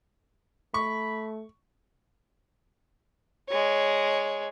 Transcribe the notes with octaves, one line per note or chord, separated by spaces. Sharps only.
A3 B5 C#6
G#3 C#5